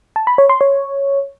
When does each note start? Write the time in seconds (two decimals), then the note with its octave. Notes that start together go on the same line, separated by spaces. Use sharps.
0.16 A5
0.27 B5
0.38 C#5
0.49 C6
0.61 C#5